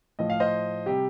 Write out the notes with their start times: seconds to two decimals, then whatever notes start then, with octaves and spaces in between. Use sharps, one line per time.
0.19 A2 F3 D#5
0.30 F5
0.40 C5 D#5
0.86 C3 G3 G4